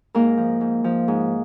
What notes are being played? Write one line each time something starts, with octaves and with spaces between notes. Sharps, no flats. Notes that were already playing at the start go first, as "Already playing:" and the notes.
G#2 A#3 A#4
F3
G#2
F3
G#2